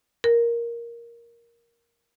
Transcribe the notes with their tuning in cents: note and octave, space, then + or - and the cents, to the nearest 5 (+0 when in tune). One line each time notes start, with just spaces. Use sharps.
A#4 +5